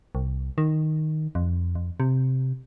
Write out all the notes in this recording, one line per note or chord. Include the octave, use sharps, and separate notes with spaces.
C2
D#3
F2
F2
C3